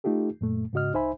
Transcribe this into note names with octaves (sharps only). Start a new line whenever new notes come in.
A3 D#4 F4 G4 A4
F#2 A#2 A3
G#2 C#3 F#4 D#5 F6
C2 D#4 C5 E5 G#5 B5